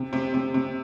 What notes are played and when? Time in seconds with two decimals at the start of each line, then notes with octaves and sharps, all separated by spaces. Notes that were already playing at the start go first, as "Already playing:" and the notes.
Already playing: C3
0.13 C3
0.34 C3
0.54 C3